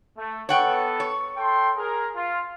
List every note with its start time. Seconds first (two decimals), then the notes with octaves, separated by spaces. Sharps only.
0.17 A3
0.49 B3 A4 C#5 F#5 G5
1.00 C#5
1.37 A4 G5 C6
1.76 G#4 A#4
2.15 F4